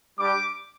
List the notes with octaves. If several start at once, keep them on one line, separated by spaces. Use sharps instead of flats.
G3 D4 G4 D6